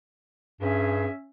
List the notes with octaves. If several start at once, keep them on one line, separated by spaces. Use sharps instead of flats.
G2 C#4 G#4 E5